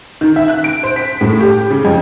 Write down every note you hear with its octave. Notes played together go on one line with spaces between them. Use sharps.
D#3
E5
F#6
D7
C5
B6
A2
G4
C#3
F2